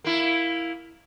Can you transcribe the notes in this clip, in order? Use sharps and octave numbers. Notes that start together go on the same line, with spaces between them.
A#3 E4